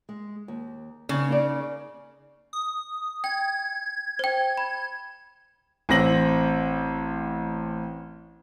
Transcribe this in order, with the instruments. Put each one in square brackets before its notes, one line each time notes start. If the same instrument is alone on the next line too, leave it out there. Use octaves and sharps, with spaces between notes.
[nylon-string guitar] G#3
D#2
[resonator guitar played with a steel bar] C#3 [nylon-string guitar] C4 D#4
[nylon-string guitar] A#3 D#4 D5
[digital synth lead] D#6
[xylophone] G5 [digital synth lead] G#6
[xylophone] C5 G5
B5
[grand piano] A1 C4 A#6 F#7